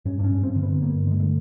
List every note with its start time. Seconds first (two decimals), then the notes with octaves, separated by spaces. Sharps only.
0.05 G2 C#4
0.19 D4
0.24 C#4
0.31 G2
0.43 C4
0.56 D3
0.63 B3
0.81 G2 A#3
1.07 D3 G#3
1.20 A3